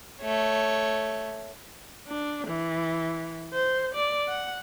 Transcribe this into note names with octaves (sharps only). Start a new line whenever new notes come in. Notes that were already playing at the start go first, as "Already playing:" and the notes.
A3 C#5
D4
E3
C5
D5
F#5